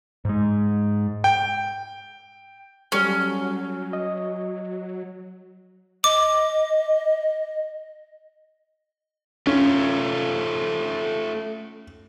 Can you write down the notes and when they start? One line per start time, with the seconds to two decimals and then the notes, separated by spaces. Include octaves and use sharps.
0.25 G#2 G#3
1.24 G5
2.92 F#3 G3 C#4 A4
3.93 D#5
6.04 D#5 D6
9.47 A3 C#4 F4